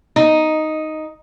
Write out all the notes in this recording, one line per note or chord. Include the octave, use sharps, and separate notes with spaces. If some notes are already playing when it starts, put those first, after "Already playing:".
D#4